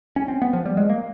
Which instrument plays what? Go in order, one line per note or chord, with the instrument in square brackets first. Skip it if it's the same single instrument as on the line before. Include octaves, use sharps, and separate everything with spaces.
[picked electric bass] C#4
C4
B3
F3
G3
G#3
A#3